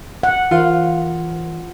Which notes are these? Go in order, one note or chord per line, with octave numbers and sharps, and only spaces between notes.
F#5
E3 F4 A#4 C5